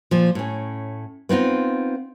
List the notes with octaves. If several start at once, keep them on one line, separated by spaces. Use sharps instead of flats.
A#2 F3
A2 C#4
B3 C4 D#4 F4